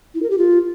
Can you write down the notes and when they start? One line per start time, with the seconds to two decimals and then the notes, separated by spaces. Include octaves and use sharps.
0.15 E4
0.23 A#4
0.30 G4
0.38 F4